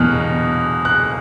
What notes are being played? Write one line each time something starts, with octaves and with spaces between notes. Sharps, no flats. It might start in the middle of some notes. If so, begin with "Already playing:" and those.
Already playing: E2 B2 F6 F#6
F#6